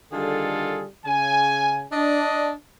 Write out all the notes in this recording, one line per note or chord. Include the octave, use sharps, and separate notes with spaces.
D3 D#3 G3 F4 G#4 A4
C#3 G#5
D4 D#5